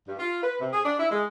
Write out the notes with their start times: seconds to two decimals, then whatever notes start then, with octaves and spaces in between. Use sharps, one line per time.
0.07 G2
0.19 F4
0.42 B4
0.61 C3
0.73 G#4
0.85 D4
0.99 E4
1.11 G#3